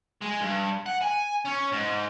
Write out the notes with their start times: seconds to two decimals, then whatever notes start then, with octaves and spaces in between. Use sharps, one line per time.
0.21 G#3
0.40 G2
0.86 F#5
1.02 G#5
1.46 C#4
1.73 G#2